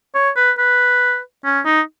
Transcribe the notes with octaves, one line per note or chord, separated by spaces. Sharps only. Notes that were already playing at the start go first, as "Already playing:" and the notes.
C#5
B4
B4
C#4
D#4